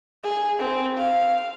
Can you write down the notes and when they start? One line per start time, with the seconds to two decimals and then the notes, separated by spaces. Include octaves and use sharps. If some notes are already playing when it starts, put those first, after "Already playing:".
0.23 G#4
0.59 C4
0.97 F5